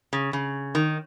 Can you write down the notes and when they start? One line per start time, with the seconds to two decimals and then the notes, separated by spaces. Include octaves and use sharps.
0.13 C#3
0.33 C#3
0.75 D#3